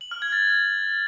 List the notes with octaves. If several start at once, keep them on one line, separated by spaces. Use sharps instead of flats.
F#7
F6
G#6
A6